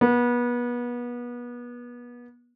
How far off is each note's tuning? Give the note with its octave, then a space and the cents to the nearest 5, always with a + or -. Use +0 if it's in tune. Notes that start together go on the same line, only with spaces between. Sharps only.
B3 -30